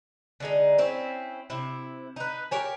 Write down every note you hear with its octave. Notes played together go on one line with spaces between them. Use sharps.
D3 G#3 D#4
C4 C#4 E4
C3 E4
D#4 B4
G4 A#4 C#5 G#5